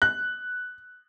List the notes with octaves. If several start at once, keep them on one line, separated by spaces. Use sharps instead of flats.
F#6